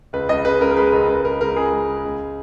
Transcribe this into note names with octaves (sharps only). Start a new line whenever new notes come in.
C#2 B4
C#2 D#5
C#3 B4
C#2 A#4
A#4
G#3 B4
C#2 A#4
C#2 B4
C#2 A#4
C#2 A#4
C#2 G#4
G#3
G#3
C#2